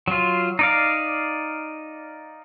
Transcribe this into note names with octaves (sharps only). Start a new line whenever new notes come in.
F#3 F4
D#4 D5 F5